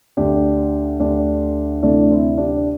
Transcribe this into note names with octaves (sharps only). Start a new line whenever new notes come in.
D2 D3 D4 G4
D2 D3 D4 G4
D2 C3 E3 A3 D4
C4 E4
D4 G4